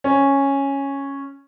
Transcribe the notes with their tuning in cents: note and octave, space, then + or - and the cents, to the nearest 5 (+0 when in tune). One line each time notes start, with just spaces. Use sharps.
C#4 -5